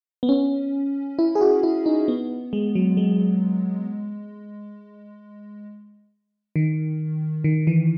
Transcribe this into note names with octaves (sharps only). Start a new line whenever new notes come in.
B3
C#4
E4
G#4
F#4
E4
D#4
B3
G#3
F#3
G#3
D#3
D#3
E3